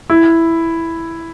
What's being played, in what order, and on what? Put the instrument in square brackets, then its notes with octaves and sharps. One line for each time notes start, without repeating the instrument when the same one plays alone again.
[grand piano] E4